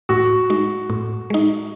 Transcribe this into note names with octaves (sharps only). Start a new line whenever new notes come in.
A2 F#4
G#3 D#4
A2
G#3 D#4